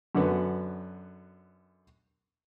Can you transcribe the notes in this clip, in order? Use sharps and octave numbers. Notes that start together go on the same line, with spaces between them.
F#2 D3 F#3 B3